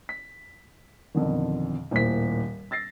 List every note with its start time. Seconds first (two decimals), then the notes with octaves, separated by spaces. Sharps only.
0.09 B6
1.14 B1 F2 D3 D#3
1.91 D#1 D#2 A2 E4 C5 B6
2.71 E6 A6 A#6 C7